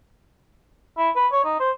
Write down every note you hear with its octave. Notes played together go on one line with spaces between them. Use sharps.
E4
B4
C#5
D#4
C5